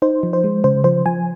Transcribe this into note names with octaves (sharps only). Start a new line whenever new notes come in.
D#4 C5
F3
C5
G#3
C#3 C5
F3 C5
F3 G#5